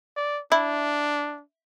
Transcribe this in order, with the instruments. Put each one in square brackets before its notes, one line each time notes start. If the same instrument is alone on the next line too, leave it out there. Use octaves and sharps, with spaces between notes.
[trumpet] D5
[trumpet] D4 [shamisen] E4